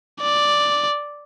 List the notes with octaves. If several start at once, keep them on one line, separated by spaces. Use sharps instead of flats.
D5